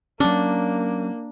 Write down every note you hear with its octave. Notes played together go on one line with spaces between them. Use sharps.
F#3 A#3 C#4 D4